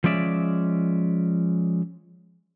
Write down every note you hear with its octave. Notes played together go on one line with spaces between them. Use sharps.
F3 G#3 C#4 D5 E5